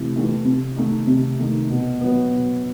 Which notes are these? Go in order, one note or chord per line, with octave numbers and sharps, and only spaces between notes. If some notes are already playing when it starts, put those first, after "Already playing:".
Already playing: C3 E3 A3 E4
E3 A3 E4 G4
C3
D#3 A3 D#4
C3
D#3 A3 D#4
B2
F#3 B3
B2